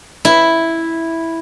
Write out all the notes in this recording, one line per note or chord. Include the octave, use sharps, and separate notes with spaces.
E4